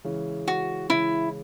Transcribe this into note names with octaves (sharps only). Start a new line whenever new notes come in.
C#3 E3 G#3 C#4
F#4
C#3 E3 G#3 C#4 E4